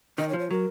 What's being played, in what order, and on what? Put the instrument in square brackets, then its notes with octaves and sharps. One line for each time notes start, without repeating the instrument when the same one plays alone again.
[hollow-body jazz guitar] D#3 [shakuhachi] D#5
[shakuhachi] C#5
[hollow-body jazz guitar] F3
[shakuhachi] C#5
[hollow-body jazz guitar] F#3 [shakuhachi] A#4